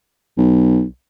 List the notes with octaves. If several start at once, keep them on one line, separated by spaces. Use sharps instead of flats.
B1